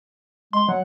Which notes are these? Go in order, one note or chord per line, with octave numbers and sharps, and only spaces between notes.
G#3 C6
F#3 F#5